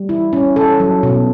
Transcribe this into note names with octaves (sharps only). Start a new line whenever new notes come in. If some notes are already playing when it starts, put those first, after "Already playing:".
Already playing: G3
E4
C#4
A4
F#3
B2